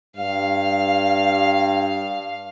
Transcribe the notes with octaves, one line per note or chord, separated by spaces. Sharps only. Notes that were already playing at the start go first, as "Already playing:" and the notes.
G2 F5